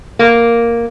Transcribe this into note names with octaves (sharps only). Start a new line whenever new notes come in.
A#3